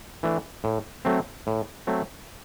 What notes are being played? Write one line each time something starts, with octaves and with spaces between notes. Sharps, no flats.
E3 A3 D4
A2
F#3 A3 C4
A2
F#3 A3 C4